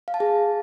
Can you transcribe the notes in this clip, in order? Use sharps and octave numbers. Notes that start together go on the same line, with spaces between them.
F5
A5
G#4